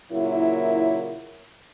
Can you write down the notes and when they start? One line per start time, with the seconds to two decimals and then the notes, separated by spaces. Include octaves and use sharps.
0.13 A#2 C#3 F#3 A#3 E4